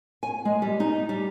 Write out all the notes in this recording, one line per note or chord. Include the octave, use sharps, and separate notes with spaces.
G#5
G#3
G3
D#4
G3